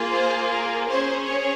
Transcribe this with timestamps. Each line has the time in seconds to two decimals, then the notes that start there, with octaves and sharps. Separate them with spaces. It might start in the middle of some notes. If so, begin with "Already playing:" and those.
Already playing: A#3 F4 G#4
0.12 C5
0.50 A#4
0.88 C#4 G#4 C5
1.26 C#5